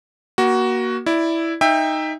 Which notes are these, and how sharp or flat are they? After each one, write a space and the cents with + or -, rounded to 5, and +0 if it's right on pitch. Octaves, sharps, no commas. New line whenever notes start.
A#3 +25 F#4 +15
E4 +0 D5 +0
D#4 +0 E5 +0 G5 +25